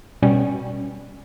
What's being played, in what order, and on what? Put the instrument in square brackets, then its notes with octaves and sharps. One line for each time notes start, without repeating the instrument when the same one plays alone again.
[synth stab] B2 G3 C#4